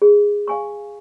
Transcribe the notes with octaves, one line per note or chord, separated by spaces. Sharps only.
G#4
F5 G#5 C#6